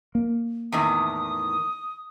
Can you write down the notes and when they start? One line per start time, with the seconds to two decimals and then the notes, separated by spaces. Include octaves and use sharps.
0.15 A#3
0.72 E2 A2 D#3 D#6